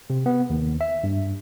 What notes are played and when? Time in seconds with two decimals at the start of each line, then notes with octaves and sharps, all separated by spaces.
0.10 C3
0.26 B3
0.50 D#2
0.81 E5
1.04 G2